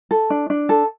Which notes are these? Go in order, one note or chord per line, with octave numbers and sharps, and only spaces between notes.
A4
D4
D4
A4